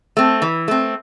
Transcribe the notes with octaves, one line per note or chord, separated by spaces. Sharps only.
A3 C4
E3
A3 C4